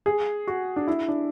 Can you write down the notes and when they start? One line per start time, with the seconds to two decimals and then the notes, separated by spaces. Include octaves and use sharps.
0.06 G#4
0.47 F#4
0.76 D4
0.88 E4
1.08 D4